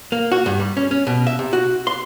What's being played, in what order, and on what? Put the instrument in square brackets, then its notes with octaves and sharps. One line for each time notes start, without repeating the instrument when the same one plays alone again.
[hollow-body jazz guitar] A#3
F#4
G2
G3
C#4
C#4
B2
E5
C3
F#4
C6